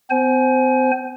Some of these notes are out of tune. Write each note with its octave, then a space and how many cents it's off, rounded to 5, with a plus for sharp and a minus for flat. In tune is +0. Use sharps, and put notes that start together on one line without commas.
C4 -45 C5 +0 G#5 +25